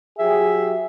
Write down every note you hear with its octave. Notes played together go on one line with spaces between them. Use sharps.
F#3 G4 G#4 E5